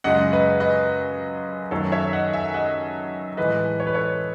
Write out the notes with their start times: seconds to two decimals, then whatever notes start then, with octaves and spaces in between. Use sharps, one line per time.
0.04 F#2 C#3 G#3 D#5 F#5
0.33 B4 D#5
0.60 B4 D#5
1.71 F#2 D#3 A3 A4 C#5
1.92 C#5 E5
2.13 D#5 F#5
2.33 E5 G#5
2.54 D#5 F#5
3.37 A2 E3 G#3 B4 D#5
3.80 C#5
3.87 B4
3.95 A4 C#5